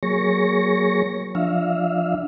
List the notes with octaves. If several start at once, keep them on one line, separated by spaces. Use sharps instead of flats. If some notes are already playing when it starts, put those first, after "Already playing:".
F#3 A#3 G#4 C#5 C#6 A#6
F3 D4 E5 F5